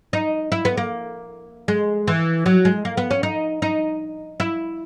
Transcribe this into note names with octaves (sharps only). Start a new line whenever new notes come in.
D#4
E4
B3
A#3
G#3
E3
F#3
G#3
A#3
B3
C#4
D#4
D#4
E4